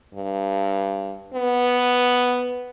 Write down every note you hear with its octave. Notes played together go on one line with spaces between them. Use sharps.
G2
B3